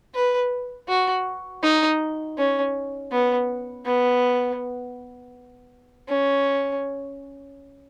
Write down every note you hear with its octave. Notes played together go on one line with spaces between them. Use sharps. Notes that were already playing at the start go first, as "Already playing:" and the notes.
B4
F#4
D#4
C#4
B3
B3
C#4